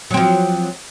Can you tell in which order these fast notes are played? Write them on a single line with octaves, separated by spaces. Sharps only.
F#3 C4 F3